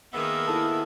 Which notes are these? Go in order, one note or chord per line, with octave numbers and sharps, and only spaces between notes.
D#3 A#3 B3 G#4 E5
E4 A4 A5